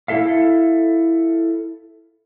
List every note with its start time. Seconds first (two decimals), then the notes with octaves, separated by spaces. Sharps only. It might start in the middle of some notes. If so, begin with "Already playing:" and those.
0.08 E4 F4 A4 E5 F5